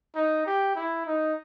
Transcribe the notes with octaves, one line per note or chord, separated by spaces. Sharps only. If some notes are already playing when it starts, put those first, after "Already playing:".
D#4
G4
E4
D#4